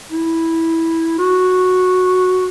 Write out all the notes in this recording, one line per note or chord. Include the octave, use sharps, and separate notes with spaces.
E4
F#4